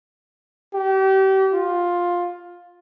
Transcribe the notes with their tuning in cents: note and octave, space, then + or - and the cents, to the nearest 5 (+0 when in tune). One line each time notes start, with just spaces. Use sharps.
G4 -35
F4 +10